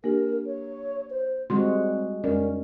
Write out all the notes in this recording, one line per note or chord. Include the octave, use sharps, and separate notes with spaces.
A#3 D4 G4 A#4
C#5
C5
G3 G#3 C4 F#4 C6
F2 G#3 C#4 A#4 D5